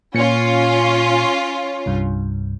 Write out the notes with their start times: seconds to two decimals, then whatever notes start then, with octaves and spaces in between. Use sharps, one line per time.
0.14 A#2 C#4 F4 C#7
1.86 C2 G2